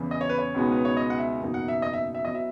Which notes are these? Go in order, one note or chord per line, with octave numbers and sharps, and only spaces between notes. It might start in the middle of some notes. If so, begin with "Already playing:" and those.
Already playing: E2 C#3 E3
D#5
C#5
B4
C#5
C#2 B2 G#3 B3 D#4
B4
C#5
D#5
F#5
E5
F#1 E2 B2 A#3 D#4
F#5
E5
D#5
E5
E5
F#3 B3 E4 D#5
E5